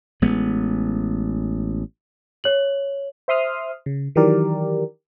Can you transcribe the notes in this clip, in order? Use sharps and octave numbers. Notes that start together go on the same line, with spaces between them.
A1 G#3 B3
C#5 F#7
C5 E5 C6 D#6 F6
C#3
D#3 E3 F#3 G4 A#4 D5